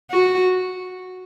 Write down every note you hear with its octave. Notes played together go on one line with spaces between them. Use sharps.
F#4